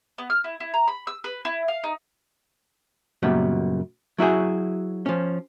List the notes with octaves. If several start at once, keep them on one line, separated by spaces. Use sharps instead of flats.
B3
F6
E4
E4
A#5
B5
E6
B4
E4
F5
D#4
F#2 A#2 C#3 G3 B3
F#3 E4 F#4 G#4
F3 C#4